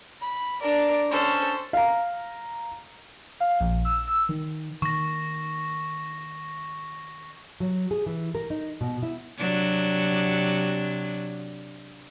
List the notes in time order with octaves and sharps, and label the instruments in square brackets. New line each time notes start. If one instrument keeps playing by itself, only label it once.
[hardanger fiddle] B5
[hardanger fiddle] D4 A#4 [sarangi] D5
[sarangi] C#4 [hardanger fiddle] A4 C5
[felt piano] F5 A#5
[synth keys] F5
A#1
E6
E6
D#3
[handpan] D#3 [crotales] C#6 A#6
[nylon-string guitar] F#3
G#4
E3
A#4
D#4
B2
E4
[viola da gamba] C3 F#3 D4